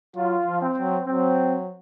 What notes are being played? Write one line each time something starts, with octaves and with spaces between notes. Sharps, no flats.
F#3 F4
F3
C4
F#3
F#3 C4